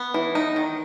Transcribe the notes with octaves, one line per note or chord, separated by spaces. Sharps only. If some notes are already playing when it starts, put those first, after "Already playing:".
Already playing: B3
E3
D#4
D#3